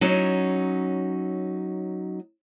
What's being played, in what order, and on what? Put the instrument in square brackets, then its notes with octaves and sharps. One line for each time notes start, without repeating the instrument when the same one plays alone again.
[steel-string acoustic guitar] F#3 C#4 D#4